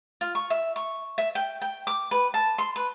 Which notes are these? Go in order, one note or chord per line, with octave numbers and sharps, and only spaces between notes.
F4
C#6
E5
C#6
E5
G5
G5
D6
B4
A5
C6
B4